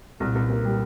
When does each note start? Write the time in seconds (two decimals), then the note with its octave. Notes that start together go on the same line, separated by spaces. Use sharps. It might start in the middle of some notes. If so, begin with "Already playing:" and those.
0.20 C2 A#2
0.35 C2
0.50 A#3
0.64 G3